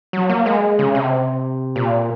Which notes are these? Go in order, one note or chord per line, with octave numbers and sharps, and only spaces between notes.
F#3
A#3
G#3
C#3
C3
A#2